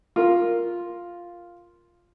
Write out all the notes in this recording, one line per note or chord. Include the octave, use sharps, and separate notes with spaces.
F4 A#4